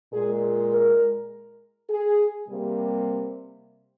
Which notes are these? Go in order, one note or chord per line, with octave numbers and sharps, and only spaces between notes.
A#2 G#3 G#4
A#4
G#4
C3 G3 A#3